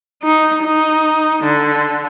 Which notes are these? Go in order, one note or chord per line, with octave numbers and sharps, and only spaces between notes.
D#4
D#4
D3